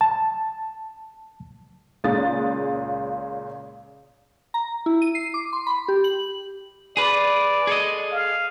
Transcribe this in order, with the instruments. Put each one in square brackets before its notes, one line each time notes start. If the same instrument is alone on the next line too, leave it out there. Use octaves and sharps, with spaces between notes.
[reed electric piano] A5
[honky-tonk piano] C#2 A#2 C#3 G#3 D#6 A6
[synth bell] A#5
E4
D#7
C7
D6
C6
B5
G4
F#7
[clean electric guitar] G#4 B4 [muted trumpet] D5
[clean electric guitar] G#4 A4 D#5
[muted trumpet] F5